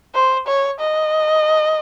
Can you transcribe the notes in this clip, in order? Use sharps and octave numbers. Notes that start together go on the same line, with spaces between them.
C5
C#5
D#5